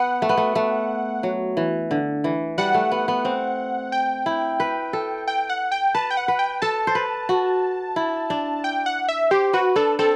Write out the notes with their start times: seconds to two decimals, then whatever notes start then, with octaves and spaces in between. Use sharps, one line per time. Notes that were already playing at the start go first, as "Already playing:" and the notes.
Already playing: B3 F#5
0.22 A3
0.29 B3
0.37 A3
0.55 A3
1.23 F#3
1.57 E3
1.91 D3
2.24 E3
2.58 G3 F#5
2.74 A3
2.92 B3
3.08 B3
3.25 C4
3.92 G5
4.26 E4
4.60 B4
4.93 A4
5.27 G5
5.50 F#5
5.72 G5
5.95 B4 A5
6.11 G5
6.17 F#5
6.28 B4
6.39 G5
6.62 A4 A5
6.87 C5
6.95 B4
7.29 F#4
7.96 E4
8.30 D4
8.64 G5
8.86 F#5
9.09 E5
9.31 G4 C5
9.53 F#4 B4
9.76 D4 A4
9.99 C4 A4